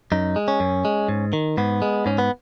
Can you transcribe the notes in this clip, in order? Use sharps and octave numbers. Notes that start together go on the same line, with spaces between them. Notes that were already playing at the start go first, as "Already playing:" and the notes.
F#2 D#4
G#3
C#4
F#2
G#3
G#2
D#3
G#2 B3
G#3
G#2 C#4
B3